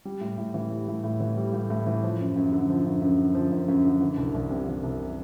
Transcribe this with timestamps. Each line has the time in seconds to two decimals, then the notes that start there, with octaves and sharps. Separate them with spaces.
0.05 G3
0.21 A2
0.38 A2
0.54 E3
0.71 G3
0.88 A2
1.04 A2
1.20 E3
1.37 G3
1.53 A2
1.70 A2
1.87 E3
2.03 F3
2.20 F#2
2.36 F#2
2.52 D3
2.69 F3
2.86 F#2
3.02 F#2
3.19 D3
3.35 F3
3.51 F#2
3.68 F#2
3.85 D3
4.01 E3
4.18 C2
4.34 C2
4.51 C3
4.67 E3
4.83 C2